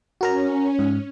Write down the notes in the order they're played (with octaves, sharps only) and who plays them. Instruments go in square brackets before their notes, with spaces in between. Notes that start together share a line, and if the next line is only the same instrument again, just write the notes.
[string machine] C#4 [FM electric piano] F#4 A#4 A#5
[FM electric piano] G#2